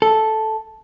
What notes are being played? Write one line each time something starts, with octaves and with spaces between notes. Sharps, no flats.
A4